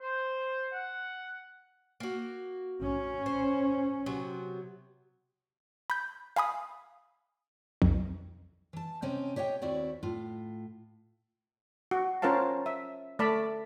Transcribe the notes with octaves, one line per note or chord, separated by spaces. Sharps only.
C5
F#5
A#3 F#4
C#4
C5
C3 F#3 B3
B5 G6
F5 G#5 B5 D#6
B1 F2
E3 A5
C3 C4 C#4 D#5
G4 C#5 D#5 E5 G5
D#2 C4 E4 F#4 D5
A2 F4
F#4
C#4 F4 A#4 C5 F5 A5
E5
A3 D5 A5 B5